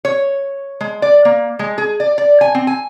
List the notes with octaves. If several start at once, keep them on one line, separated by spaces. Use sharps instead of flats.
C#5
G#3
D5
A#3
G#3
G#4
D5
D5
G#5
C4
G#5